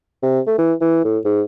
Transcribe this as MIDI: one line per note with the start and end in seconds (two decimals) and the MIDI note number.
0.22 0.40 48
0.47 0.54 57
0.58 0.73 52
0.81 1.01 52
1.04 1.18 45
1.25 1.42 44